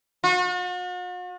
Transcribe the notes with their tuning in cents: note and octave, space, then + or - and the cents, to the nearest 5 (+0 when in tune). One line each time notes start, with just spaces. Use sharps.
F#4 -45